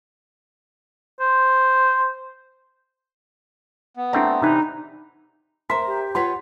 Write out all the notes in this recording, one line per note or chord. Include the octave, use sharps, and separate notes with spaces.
C5
B3
A3 C4 D4 D5 A#5
C3 E3 D#4 B4
A#4 C5 E5 A#5 C6 B6
G4
F4 B4 C#5 F#5 C6 B6